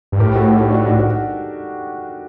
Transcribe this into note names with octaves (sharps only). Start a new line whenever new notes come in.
G2
A2 G4 A#4
F#4 A4
D#4 G4
D4 F#4
D4 F#4
F#4